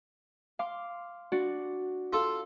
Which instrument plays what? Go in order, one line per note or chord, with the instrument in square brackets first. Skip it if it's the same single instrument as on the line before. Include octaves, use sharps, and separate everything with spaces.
[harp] F5 C6 D6
D4 F#4 D5
[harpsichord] F4 A4